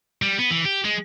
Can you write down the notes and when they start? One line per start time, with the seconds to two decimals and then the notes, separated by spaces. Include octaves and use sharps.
0.22 G3
0.39 B3
0.51 E3
0.65 G4
0.85 G#3